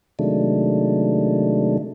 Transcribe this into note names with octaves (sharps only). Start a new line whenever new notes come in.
C3 D#3 F#3 G#3 A3 D4